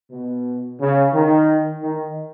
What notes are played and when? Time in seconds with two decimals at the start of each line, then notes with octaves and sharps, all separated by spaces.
0.10 B2
0.80 C#3
1.14 D#3
1.83 D#3